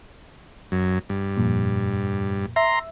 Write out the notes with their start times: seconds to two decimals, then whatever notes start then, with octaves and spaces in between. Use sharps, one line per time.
0.72 F#2
1.09 G2
1.37 F2 A#2
2.56 E5 A#5 C6